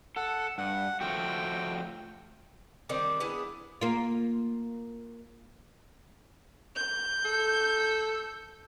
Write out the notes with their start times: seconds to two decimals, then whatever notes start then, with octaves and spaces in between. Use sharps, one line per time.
0.16 A4 F#5
0.58 G2 F#5
1.01 F3 A3 F#4 G5
2.89 D#3 G3 C4 D4
3.20 B3 D4 E4 G#4
3.81 A#3 F4
6.75 G6
7.25 A4